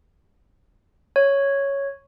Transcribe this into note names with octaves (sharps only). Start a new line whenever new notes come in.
C#5